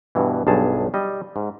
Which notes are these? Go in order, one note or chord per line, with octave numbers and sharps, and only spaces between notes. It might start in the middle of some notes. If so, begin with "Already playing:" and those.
G2 B2 E3
B1 G2 G#4 A5
G3 D#5
G#2